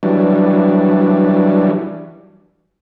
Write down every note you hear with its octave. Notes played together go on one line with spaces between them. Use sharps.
E3 F#3 G3 D4